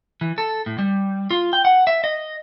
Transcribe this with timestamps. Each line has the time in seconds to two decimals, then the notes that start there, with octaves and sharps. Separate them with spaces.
0.21 E3
0.38 A4
0.66 A2
0.79 G3
1.31 F4
1.53 G5
1.65 F#5
1.87 E5
2.04 D#5